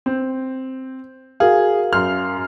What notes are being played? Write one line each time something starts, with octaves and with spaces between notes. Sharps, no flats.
C4
F#4 G#4 A#4 F5
F#2 C6 F6